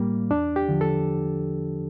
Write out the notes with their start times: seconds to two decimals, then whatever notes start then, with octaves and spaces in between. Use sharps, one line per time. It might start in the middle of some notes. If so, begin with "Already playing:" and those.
Already playing: A2 G3 A#3
0.30 E2 D4
0.56 G4
0.69 D3 F3
0.81 A4